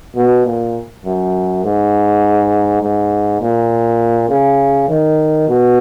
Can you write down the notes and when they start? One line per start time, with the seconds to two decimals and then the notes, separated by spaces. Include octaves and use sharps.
0.16 B2
0.45 A#2
1.05 F#2
1.64 G#2
2.82 G#2
3.41 A#2
4.29 C#3
4.88 D#3
5.48 B2